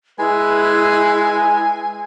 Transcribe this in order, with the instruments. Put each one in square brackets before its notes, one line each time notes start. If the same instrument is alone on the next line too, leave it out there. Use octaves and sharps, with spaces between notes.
[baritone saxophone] G#3 [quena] E4 [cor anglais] B4 [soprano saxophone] G#5